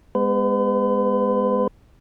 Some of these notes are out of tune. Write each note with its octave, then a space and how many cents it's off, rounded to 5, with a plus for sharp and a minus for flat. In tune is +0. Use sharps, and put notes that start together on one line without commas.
G#3 -30 B3 +0 B4 +45